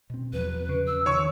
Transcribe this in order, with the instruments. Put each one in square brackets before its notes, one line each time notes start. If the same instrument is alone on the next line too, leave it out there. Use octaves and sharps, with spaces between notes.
[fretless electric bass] B2 C4
[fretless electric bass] E2 F3 F#3 [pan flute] B4
[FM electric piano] C#3
[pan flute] E6
[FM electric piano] D#3 [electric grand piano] C#5 C#6